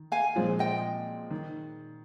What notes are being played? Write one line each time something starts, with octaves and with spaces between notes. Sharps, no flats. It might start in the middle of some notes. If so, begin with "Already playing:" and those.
Already playing: D#3
F5 G#5
A#2 F3 G#3 C4
D#5 G5
D#3